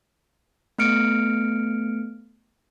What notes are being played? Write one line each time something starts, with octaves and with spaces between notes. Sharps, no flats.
A3 B3 F6 C#7 D7